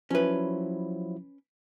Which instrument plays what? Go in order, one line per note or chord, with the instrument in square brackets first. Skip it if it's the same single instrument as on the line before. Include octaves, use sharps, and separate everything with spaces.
[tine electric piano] F3 F#3 E4 [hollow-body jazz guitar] C#4 B4